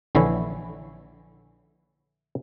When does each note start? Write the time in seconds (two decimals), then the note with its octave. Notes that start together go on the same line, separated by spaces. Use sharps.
0.15 A#1 D3 E3 E4 C#5 G#5